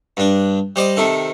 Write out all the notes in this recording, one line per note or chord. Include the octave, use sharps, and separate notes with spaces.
G2 D4
G3 C5 D5 D#5
C3 D#3 A4